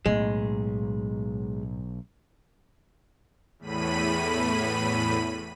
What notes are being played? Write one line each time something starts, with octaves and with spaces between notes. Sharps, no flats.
B1 A2 G#3
E2 A2 B5 D#7